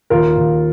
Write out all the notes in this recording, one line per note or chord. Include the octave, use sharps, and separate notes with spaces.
D#2 F4 A#4
D#2